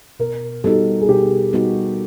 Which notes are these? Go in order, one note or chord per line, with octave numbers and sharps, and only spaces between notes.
B2 A#4
G3 B3 D#4 F#4 A4
G#4
B2 G4
G3 B3 D#4 F#4